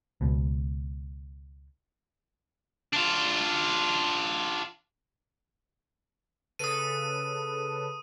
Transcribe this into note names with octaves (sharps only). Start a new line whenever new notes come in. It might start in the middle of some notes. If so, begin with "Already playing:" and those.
C#2 B2
D4 F4
C#3 A4 B4 D#6 D#7